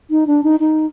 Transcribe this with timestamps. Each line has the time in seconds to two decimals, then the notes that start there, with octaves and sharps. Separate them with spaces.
0.11 D#4
0.27 D4
0.44 D#4
0.60 D#4